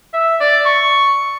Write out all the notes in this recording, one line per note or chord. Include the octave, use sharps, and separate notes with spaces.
E5
D5
C#6